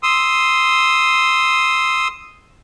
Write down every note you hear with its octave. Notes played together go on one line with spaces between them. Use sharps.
C6 D#6 E6